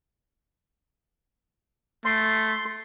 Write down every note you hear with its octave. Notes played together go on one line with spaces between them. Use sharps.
A3 C6